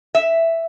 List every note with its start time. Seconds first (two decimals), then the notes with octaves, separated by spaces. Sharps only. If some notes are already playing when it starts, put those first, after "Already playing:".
0.15 E5